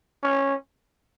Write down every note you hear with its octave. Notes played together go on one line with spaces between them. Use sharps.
C#4